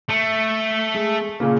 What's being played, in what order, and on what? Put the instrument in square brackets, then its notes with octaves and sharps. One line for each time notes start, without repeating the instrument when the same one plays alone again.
[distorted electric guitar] A3
[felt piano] G#3
A#2 C#3 A#3